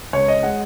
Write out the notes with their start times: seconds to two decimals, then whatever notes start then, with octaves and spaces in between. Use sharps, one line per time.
0.13 C#2 C#5
0.28 D#5
0.43 G#3 F#5